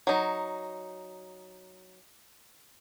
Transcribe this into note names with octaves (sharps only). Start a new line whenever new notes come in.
F#3 D#4